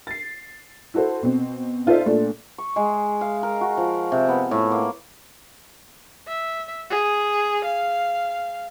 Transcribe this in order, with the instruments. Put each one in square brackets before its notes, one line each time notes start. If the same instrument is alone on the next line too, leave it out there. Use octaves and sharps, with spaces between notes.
[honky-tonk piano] A6 C7
E4 F#4 A4 C5
B2 C4
D#4 F4 A4 C5 D5 E5
A#2 A3 D4
[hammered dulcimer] C#6
G#3
F5
A#4
F#4
F3
C3
B3
A2
A#3
[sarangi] E5
G#4
F5